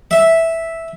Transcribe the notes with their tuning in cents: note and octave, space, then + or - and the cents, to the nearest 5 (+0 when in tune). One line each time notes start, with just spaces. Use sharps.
E5 -5